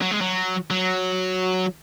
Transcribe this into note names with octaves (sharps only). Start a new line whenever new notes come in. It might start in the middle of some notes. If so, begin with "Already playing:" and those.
F#3
G#3
F#3
F#3